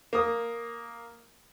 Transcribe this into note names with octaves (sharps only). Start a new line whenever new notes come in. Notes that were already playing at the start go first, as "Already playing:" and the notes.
A#3 D#6